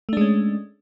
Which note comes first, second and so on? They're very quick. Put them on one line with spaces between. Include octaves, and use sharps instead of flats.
A3 D4 G#3 C#4